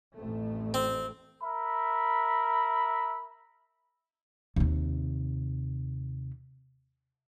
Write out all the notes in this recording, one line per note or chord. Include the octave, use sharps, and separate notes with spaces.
A1 F2 A3
C4
A#4 E5 B5
D#2 C3